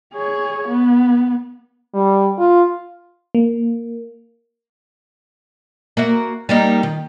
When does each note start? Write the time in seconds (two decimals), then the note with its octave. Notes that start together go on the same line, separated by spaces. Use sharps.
0.14 G#4 C#5
0.67 B3
1.94 G3
2.39 F4
3.35 A#3
5.97 A#3 F#4 E5
6.49 G3 A#3 D#4
6.83 D#3